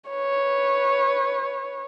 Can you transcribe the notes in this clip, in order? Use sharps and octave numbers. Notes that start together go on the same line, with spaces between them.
B4 C#5